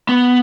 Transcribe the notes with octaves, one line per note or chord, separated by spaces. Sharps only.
B3